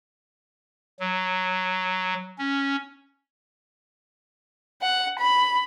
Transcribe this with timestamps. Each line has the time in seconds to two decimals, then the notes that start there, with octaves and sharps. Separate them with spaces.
1.00 F#3
2.38 C#4
4.81 F#5
5.19 B5